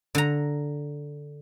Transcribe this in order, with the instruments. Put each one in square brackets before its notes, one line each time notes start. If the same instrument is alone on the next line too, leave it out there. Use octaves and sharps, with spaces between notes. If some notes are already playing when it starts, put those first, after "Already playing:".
[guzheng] D3 A#5